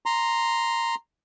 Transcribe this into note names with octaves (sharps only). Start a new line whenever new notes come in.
A#5 C6